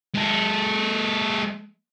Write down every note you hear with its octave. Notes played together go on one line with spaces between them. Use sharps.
G#3 A4